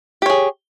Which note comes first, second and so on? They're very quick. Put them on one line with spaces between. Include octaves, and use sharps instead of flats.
G4 C#5 G#4